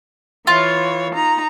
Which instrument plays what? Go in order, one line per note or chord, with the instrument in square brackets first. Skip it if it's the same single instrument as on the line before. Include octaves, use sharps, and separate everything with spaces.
[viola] E3 C#5 [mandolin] F4
[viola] D#4 A#5